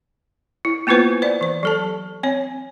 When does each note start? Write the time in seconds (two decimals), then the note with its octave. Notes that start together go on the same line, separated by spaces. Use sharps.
0.65 E4
0.87 A#3 B3 E4 F4 B4 C5
1.22 C5 D5
1.41 E3 C5
1.63 F#3 A4 A5
2.23 C4 C#5